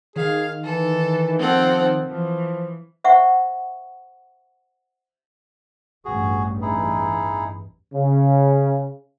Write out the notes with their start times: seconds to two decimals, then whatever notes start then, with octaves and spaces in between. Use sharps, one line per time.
0.16 D#3 G#4 F5
0.64 E3 A4
1.38 F3 C4 A4 F#5
2.08 E3 F3
3.04 C5 E5 F#5 C#6
6.05 A1 E2 G2 F#4 G#4
6.62 D#4 E4 G#4
7.94 C#3